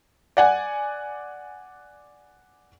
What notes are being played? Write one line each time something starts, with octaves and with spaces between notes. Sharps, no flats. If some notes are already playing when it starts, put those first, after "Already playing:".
D5 F#5 G#5